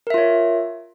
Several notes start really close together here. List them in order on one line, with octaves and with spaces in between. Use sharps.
A#4 E5 F4 C#5